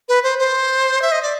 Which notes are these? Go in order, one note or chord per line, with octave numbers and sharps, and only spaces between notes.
B4
C5
C5
E5
D#5
D5